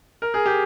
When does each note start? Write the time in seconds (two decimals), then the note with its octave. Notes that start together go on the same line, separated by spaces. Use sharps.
0.22 A#4
0.34 G#4
0.46 G4